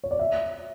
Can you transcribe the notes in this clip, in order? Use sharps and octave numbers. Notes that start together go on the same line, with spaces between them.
C#5
D5
E5